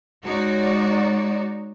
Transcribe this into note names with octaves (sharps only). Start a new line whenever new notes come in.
G#3 D#4 F#4 C#5 D5